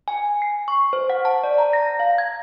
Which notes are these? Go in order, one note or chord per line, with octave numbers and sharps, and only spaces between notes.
G#5
C7
C#6
C5
F#5
A5
D5
A#5
A#6
F5
G#6